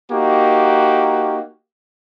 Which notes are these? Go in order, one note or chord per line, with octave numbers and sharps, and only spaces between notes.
A#3 D#4 F#4 G4